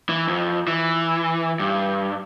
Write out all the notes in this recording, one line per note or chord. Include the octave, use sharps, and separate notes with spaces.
E3
F2
E3
G2